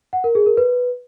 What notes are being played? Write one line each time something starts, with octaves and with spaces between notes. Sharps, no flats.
F#5
A#4
G#4
A#4
B4